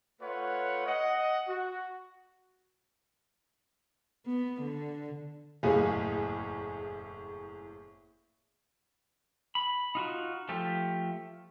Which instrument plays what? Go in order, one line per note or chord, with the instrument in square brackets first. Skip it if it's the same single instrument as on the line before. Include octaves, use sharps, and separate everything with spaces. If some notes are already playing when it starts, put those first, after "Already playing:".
[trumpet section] A3 F4 B4 C#5 F#5
D#5 F#5
F#4
[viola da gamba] B3
D3
[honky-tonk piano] F#1 E2 A2 G#4 F5
[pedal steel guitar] B5
D#4 F4 F#4
F3 A3 F4 G4